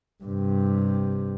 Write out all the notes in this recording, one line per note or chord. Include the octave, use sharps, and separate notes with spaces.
G2 C3